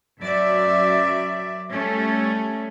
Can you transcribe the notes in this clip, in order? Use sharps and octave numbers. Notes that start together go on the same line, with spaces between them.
F#2 F#3 D5 E5
G3 A3 C#4